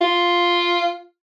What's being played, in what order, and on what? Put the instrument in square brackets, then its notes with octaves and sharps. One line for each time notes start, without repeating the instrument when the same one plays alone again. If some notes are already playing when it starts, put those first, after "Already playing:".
[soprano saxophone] F4